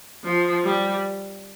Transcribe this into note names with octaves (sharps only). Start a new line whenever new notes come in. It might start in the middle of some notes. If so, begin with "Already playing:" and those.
F3
G3